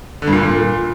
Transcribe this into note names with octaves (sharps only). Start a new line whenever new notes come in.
D3
G2
A#2
D3
A#2